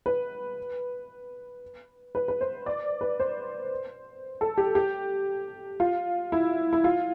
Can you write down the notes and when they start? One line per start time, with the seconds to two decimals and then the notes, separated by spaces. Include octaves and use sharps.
0.06 B4
2.15 B4
2.28 B4
2.41 C5
2.66 D5
3.01 B4
3.19 C5
4.41 A4
4.58 G4
4.75 G4
5.80 F4
6.32 E4
6.73 E4
6.84 F4